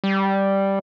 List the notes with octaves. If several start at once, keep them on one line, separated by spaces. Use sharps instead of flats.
G3